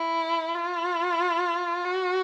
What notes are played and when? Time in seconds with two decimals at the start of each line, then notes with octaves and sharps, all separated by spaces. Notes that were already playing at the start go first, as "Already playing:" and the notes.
Already playing: E4
0.55 F4
1.85 F#4